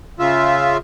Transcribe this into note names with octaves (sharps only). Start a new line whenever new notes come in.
C#3 F4 E5